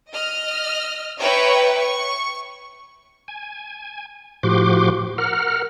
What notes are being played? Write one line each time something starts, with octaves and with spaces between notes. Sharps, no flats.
D#5 F6
B4 C#5 E5 G5 A#5 C#7
C#6
G#5
A2 F3 F#4 G4 C6 D6
A#4 F#5 F6